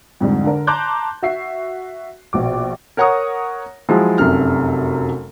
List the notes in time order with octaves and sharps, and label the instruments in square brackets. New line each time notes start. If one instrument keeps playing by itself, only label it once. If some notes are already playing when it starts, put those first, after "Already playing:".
[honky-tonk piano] F2 G#2 D3 G3
D3 D4 A#4
A5 A#5 C6 D6 F#6 G6
F#4 E5 C7
A#1 B2 D6
[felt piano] A#4 C#5 F#5 A#5 C#6 D#6
F3 F#3 G#3 E4
F1 F#2 C3 F6